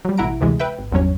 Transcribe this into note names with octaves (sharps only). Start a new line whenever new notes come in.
F#3 G3
A1 B2 E4 F#5 A#5 D7
D2 A2 C3 E3 G#3
B4 E5 G5
G#1
G#1 E2 G2 F#3 C#4 C#5